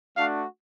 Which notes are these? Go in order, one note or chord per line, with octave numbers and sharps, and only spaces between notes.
A3 D4 F#4 F5